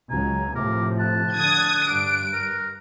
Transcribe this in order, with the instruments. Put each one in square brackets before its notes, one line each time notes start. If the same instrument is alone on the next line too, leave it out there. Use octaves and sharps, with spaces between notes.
[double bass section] C#2 F#3 [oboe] G#5 [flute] A#5
[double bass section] A2 C3 F3 [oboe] A#4 [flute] D6
[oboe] A5 [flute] F#6
[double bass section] D3 [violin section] D#6 G#6
[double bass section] G2 [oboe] D4 [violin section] D7
[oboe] A#4